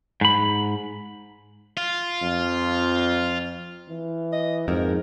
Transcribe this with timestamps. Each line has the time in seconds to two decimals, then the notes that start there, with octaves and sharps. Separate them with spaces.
0.21 G#2 B5
1.77 F4
2.22 F2
3.90 E3
4.33 D#5
4.68 F2 G#2 A#4